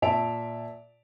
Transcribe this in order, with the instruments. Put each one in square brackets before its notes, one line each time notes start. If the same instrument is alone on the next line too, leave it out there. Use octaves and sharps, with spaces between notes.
[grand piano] A#2 E5 A5 D7 F7